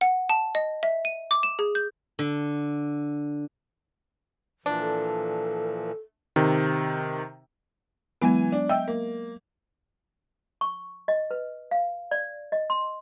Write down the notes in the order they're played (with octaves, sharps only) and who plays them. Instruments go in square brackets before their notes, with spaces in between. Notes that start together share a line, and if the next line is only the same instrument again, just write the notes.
[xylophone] F#5
A5
D#5
E5
D#7
D6
E7
G#4
G6
[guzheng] D3
[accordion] A#2 E3 F3 [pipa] D4
[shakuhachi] A4
[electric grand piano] C3 D#3
[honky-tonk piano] E3 G#5 [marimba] F#3 G#3 B3
[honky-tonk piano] D4
[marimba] D#5 E5 E6 [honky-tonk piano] G5
[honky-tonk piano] A#3
[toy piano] C#6
D#5
B4
F5
D5
D#5
C6